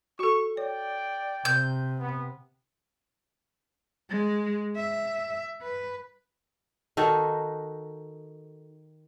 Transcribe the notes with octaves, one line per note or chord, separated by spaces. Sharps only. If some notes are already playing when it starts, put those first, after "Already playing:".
F#4 A4 C#6
C#5 D5 G5
C3 G6
B3
G#3
E5
B4
D#3 D#4 F#4 A4